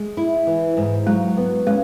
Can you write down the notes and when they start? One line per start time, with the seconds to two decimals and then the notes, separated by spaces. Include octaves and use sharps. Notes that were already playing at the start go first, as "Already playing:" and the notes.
Already playing: G#3
0.17 E4
0.47 E3
0.77 G#2
1.06 F#3 G#3
1.37 B3
1.67 G#3 C#4